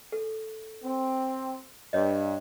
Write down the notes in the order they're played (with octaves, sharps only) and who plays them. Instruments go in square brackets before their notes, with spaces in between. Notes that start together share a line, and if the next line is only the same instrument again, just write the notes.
[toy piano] A4
[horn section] C4
[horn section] G2 [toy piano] C#5 D#5